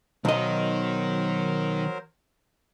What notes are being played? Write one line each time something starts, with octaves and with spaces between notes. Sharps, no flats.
B1 D#3 F#3 A#4 C5 D#5